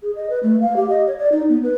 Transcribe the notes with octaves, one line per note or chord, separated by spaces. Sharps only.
G#4
D#5
B4
A3
F5
G4
D#5
C#5
D5
D#4
B3
B4